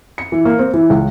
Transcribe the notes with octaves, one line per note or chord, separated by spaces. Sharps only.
C#7
E3
A#3
C4
E3
C#2